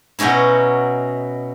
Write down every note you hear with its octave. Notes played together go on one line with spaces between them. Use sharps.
B2 F#3 C#4 D#4 E4